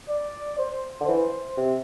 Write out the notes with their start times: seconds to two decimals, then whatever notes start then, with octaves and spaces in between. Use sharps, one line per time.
0.09 D5
0.58 C5
1.01 D3
1.08 E3 C5
1.57 C3